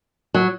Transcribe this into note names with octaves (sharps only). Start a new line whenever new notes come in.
F#3